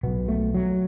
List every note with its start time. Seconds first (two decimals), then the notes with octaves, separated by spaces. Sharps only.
0.03 B1 B2 B3
0.28 A3
0.54 F#3